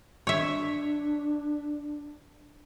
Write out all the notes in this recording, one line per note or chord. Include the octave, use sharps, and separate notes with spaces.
D4 C#5 E5